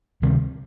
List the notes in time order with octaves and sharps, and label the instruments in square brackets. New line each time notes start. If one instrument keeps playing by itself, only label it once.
[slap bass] D2 C3 D#3 G3